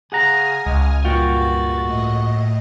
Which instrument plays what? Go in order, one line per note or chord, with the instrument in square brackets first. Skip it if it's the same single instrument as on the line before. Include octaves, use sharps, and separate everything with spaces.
[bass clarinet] C#3 [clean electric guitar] G#4 F#5 A#5 [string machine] G#5 D#6 F6
[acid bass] C#2 [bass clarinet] G#3
[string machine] G2 A6 [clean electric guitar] A#2 F4 G5 [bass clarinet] F#4
[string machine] A2 D#5